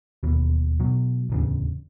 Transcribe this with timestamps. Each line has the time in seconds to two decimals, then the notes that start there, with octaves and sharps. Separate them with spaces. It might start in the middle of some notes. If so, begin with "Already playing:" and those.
0.23 E1 D#2 B2
0.80 B2 F#3
1.30 D1 E2 C#3